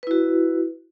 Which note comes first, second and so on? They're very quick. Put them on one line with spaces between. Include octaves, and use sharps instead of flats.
B4 E4 F#4